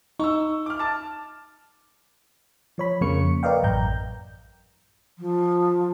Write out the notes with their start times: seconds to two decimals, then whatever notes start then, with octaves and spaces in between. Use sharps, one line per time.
0.19 D#4 C#6 E6
0.66 D6 F6
0.79 A5 D6 A6
2.78 F3 C#5 B5
3.01 F2 C#3 A#3 C#6 C#7
3.43 A#4 B4 D5 D#5 F5 G5
3.63 A1 F#2 G5 A#5 G6
5.19 F3